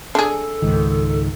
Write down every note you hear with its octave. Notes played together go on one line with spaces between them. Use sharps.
D4 G#4 A4
C#2 G#2 D#3